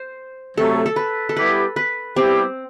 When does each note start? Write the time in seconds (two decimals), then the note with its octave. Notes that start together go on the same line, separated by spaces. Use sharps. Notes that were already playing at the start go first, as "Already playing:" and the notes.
Already playing: C5
0.57 C3 F#3 A3 A4
0.86 A4
0.96 B4
1.29 A4
1.36 G3 B3 E4 G4 B4
1.76 B4
2.16 G3 B3 C4 E4 G4